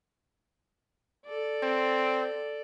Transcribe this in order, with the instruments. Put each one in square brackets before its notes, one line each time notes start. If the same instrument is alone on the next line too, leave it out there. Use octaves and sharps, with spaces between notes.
[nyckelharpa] A4 D5
[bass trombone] C4